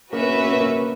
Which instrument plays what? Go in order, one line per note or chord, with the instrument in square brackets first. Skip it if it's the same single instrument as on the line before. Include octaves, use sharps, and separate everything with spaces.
[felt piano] A#3 [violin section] C#4 F#4 B4 E5
[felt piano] B3
A#3
B3
A#3
B3
A#3